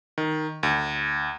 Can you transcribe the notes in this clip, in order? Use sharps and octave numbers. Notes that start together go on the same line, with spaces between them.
D#3
D2